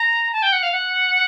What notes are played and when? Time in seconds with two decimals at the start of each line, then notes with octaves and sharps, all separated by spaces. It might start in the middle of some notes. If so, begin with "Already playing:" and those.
Already playing: A#5
0.33 A5
0.43 G5
0.53 F#5
0.63 F5
0.72 F#5